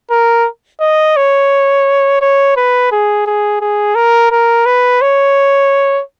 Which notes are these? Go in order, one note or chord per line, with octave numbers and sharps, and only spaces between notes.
A#4
D#5
C#5
C#5
B4
G#4
G#4
G#4
A#4
A#4
B4
C#5